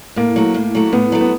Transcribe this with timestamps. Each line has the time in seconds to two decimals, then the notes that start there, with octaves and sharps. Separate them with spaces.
0.16 A2 A#3
0.36 F#3 A3
0.54 A2
0.75 F#3 A3
0.93 A2 B3
1.12 F#3 A3
1.21 B3